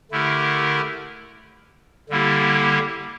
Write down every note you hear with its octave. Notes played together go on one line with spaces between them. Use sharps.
D3 A3 E4 G4 A#4
D3 G3 A#3 E4 G4